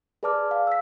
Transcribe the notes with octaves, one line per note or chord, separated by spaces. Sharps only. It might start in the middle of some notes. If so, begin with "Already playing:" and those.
G#4 B4 D5 A5 D6 F6
F5
E6 B6